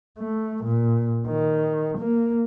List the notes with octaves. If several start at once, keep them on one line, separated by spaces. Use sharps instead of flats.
A3
A#2
D#3
A#3